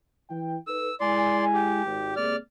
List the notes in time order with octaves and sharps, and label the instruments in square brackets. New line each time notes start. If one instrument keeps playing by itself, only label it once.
[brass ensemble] E3 G5
[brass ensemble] D#4 A4 B4 [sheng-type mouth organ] E6
[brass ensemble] G#3 E4 G#5 [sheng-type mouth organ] D5 C6
[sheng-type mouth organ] G4
[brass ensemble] G#1
[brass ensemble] C3 G#3 A#3 [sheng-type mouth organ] D5 F6